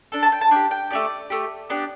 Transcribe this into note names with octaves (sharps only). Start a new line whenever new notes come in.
D4 A4
A5
G5
A5
D4 G4 G5
G5
A3 D4 G4 D5
A3 G4
B3 D4 G4